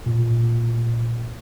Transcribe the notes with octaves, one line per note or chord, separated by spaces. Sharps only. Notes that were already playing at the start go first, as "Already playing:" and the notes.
A#2